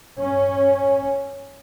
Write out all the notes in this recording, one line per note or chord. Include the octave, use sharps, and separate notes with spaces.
G2 C#4